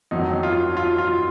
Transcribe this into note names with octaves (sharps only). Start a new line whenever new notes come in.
F2 D#3 F#3 D#4
F4
F4
F4